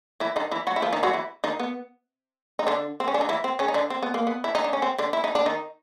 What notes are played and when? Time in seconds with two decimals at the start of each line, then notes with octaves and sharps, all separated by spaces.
0.20 E3 E4
0.36 D#3 D#4
0.51 E3 E4
0.67 F#3 F#4
0.76 E4
0.82 F3 F4
0.93 D#3 D#4
1.03 F#3 F#4
1.13 E3 E4
1.44 D#3 D#4
1.60 B3
2.59 D#4
2.67 D3 D4
3.00 C4
3.08 C#4
3.14 D4
3.21 D#4
3.29 E3 E4
3.44 C4
3.59 C#3 C#4
3.68 D#4
3.74 D3 D4
3.90 C4
4.03 B3
4.14 A#3
4.27 B3
4.44 E4
4.55 D#4
4.64 D4
4.73 C#4
4.82 C4
4.98 D3 D4
5.13 E4
5.24 D#4
5.35 D4
5.46 D#3 D#4